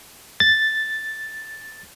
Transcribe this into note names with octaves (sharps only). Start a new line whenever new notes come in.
A6